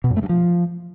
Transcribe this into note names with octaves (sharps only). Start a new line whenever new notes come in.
B2
F#2
A3
G2
F3